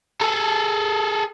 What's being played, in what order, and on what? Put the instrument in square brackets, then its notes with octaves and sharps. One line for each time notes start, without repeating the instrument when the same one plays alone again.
[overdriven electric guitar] G#4 A4